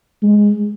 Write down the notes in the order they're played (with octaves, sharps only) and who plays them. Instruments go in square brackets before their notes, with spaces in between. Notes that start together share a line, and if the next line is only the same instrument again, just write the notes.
[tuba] G#3